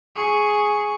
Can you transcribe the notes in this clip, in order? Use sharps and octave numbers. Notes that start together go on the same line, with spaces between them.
G#4 C#6